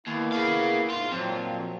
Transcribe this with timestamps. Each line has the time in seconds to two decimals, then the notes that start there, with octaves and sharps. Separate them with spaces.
0.07 D#2 A#3 B3 E4
0.32 G#4 F5
0.90 G#2 F4
1.11 F2 A#2 F#3 C4